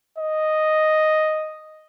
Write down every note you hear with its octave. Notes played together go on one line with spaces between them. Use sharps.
D#5